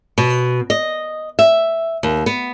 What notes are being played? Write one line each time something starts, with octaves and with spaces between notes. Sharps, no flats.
B2
D#5
E5
D#2
B3